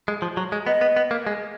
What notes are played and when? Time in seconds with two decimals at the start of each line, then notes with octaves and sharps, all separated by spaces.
0.08 G#3
0.22 F3
0.37 F#3
0.52 G#3
0.67 B3 D#5
0.81 B3
0.97 B3
1.11 A#3
1.27 G#3